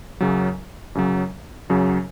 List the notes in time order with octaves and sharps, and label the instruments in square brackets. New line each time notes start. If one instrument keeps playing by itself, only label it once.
[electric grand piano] F#2 C#3 F#3
F#2 C#3 F#3
F#2 C#3 F#3